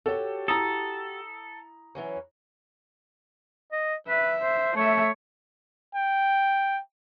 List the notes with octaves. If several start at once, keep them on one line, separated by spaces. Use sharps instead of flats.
F#4 G4 A4 C#5
E4 A4 A#5 D#6
E3 F#3 C#4
D#5
B4 E5
C5
A3 C#5 E5
G5